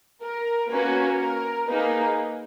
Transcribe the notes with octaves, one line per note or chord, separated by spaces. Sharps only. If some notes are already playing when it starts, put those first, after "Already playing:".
A#4
A#3 C#4 F#4 B4
A#4
A#3 D#4 G#4 B4